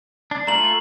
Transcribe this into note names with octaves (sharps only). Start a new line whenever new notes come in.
D4
A3 F4 A4 A#5 F#7